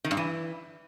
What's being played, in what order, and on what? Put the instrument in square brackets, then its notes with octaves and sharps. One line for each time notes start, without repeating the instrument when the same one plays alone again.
[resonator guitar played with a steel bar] D#3
G2
E3